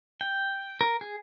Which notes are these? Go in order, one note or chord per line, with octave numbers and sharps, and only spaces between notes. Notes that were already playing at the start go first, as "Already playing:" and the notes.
G5
A#4
G#4